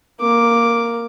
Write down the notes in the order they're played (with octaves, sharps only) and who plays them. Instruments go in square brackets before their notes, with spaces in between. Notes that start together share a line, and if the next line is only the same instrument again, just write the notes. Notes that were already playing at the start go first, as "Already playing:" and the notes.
[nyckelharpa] A#3 D6